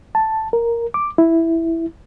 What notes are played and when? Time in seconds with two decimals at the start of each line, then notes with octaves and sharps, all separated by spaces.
0.15 A5
0.53 A#4
0.94 D6
1.18 E4